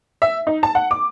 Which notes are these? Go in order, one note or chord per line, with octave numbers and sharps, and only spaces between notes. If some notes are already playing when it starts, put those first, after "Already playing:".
E5
D#4
A5
F#5
D6